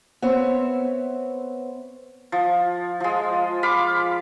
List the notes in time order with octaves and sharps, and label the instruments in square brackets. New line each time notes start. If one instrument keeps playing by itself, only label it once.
[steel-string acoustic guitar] B3 C4 C#5 E5
[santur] F3
F3 G#3
F5 B5 D6